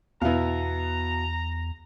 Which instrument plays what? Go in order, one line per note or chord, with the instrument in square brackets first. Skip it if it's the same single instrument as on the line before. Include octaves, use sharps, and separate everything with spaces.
[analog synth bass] E2 [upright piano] B2 B3 [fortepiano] E4 F5 [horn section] A#5